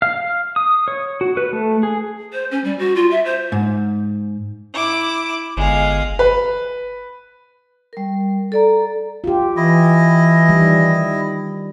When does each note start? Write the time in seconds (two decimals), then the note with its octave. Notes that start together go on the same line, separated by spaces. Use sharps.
0.02 F5
0.56 D#6
0.88 C#5
1.21 F#4
1.37 B4
1.53 A3
1.83 G#4
2.33 C5
2.51 C#4
2.64 G3
2.79 F#4
2.95 F4
3.11 E5
3.25 C5
3.52 G#2
4.73 E4 D6
5.57 G1 G#3 F5
6.19 B4
7.93 G3 A#4
8.52 A4 D5 A#5
9.24 F4 G4
9.57 E3 E4 D#5
10.49 D#3 G3